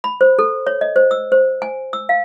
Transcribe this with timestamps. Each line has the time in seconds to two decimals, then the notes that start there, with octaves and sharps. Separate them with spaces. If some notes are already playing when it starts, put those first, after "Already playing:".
0.04 B5
0.21 C5
0.39 A4
0.67 C#5
0.81 D#5
0.96 C5
1.11 E6
1.32 C5
1.62 G#5
1.93 E6
2.09 F5